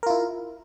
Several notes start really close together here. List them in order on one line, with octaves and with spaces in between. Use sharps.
A#4 F4 E4